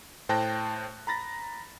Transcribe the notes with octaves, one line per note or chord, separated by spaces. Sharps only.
A2 C5 G5 A5 F#6 A#6
A#5 B5 A6 A#6